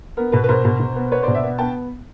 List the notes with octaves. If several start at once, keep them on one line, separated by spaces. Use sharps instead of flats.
B3 A#4
B2 B4
B4
B2 A#4 C5
B2
B2
B3
B3 B4 C#5
C5 D5
B2
D5 E5
B3
B3 G5 A5